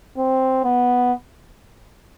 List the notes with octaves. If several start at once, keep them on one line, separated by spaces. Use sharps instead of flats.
C4
B3